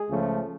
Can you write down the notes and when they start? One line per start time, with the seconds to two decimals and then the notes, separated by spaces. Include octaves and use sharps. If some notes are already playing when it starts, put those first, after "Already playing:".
Already playing: G#3 G#4
0.09 C#2 C#3 F3 A3